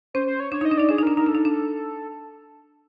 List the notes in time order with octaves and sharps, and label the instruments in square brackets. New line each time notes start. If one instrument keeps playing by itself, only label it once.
[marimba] C#4 [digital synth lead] C5
[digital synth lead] C5
C#5
[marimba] D4 [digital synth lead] C#5
[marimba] D#4 [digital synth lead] D#5
[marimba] D4
[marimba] D#4 [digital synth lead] D5
[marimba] D4 [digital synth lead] G#4
[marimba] D#4
[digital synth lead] A#4
[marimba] D4
[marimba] D#4 [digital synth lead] A#4
[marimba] D4 [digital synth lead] A4
[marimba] D#4
D4